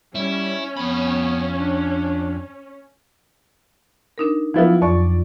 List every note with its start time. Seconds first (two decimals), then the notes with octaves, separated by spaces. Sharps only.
0.15 G3 C#4 E4
0.77 F2 B3 B5
1.57 D4
4.18 D4 D#4 A#4
4.54 F3 F#3 B3 E4 F4 F5
4.82 F2 D5 C#6